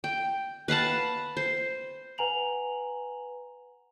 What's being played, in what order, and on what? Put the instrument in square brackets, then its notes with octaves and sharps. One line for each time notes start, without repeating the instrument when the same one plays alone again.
[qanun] G5
B4 F5 F#5 A5
C5
[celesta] B4 F#5 G#5 A#5 F7 F#7